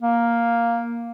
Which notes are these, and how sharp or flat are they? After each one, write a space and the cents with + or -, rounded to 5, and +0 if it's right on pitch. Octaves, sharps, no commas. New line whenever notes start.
A#3 +5